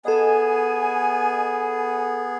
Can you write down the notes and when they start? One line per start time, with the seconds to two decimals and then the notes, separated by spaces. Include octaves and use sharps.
0.05 B3 G#4 A4 D#5 G#5